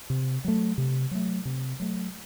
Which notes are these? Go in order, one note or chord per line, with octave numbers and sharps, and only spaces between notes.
C3
F#3 A3
C3
F#3 A3
C3
F#3 A3